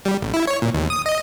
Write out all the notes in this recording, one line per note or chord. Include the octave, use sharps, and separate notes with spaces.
G3
A1
E4
C#5
A#2
D#2
D#6
D#5